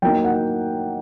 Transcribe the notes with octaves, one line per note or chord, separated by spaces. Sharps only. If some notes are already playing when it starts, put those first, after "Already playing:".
F#3 A#3 D#4 G5
F#5